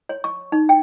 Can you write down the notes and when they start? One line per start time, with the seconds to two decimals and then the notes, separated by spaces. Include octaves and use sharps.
0.09 C#5
0.24 C#6
0.52 D#4
0.69 G5